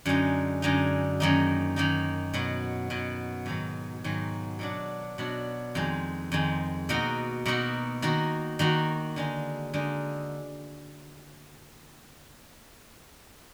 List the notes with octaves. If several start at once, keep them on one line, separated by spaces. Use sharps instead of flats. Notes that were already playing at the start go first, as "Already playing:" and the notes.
F#2 D3 G#3 D#4
F#2 D3 G#3 D#4
F#2 D#3 A#3 D#4
F#2 D#3 A#3 D#4
B2 F#3 B3
B2 F#3 B3
G#2 D#3 F#3
G#2 D#3 F#3
B2 F#3 D4
B2 F#3 D4
F2 D#3 G#3
F2 D#3 G#3
B2 A#3 D#4 F#4
B2 A#3 D#4 F#4
D#3 A#3 D#4 F#4
D#3 A#3 D#4 F#4
D3 G#3 D#4
D3 G#3 D#4